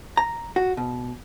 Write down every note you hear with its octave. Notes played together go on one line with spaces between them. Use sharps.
A#5
F#4
B2